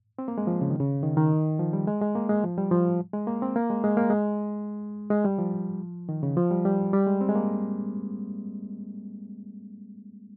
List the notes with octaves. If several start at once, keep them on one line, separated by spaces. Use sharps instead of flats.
C4
A#3
G#3
F3
C#3
D#3
C#3
D#3
D#3
F3
G3
G#3
G#3
A#3
G#3
F3
G3
F3
G#3
A#3
C4
A#3
G#3
G#3
A#3
G#3
G#3
G3
F3
D#3
C#3
F3
G3
G3
G3
G#3
C4
G#3
A#3